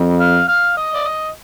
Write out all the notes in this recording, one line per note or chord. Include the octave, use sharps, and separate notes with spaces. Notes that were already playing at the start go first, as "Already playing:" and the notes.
Already playing: F2
F5
F5
D#5
D5
D#5